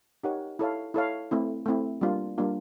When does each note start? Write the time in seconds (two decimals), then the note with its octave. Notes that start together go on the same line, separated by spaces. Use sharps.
0.23 D#4 G4 A#4 C#5 F#5
0.59 E4 A4 C#5 F5
0.94 E4 A4 C#5 F5
1.31 A3 C4 E4
1.66 A3 C4 E4
2.01 G3 A#3 D4 F4
2.38 G3 A#3 D4 F4